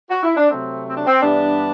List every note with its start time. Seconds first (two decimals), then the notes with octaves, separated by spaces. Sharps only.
0.11 F#4
0.23 E4
0.37 D4
0.49 C3 F#3 A3 C4
0.87 C4
0.97 D4
1.07 C4
1.22 G2 E3 G3 B3 D4